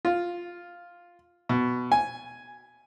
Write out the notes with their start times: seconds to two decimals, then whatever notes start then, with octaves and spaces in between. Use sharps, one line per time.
0.05 F4
1.49 B2
1.92 G#5